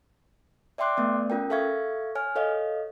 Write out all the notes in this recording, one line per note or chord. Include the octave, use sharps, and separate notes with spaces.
D5 E5 G5 C6 D6 F#6
A3 B3 D5
C#4 F4 A#4 G5
A4 E5 F5 C#6 G#6
C#5 G#5 F6
A4 C#5 D#5 F5